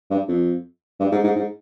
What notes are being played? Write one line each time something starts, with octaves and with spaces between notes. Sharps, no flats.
G2
F2
G2
G#2
G#2
G#2